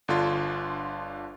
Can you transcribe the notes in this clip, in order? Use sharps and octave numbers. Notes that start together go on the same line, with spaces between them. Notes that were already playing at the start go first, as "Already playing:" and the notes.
G1 D3 D4 F4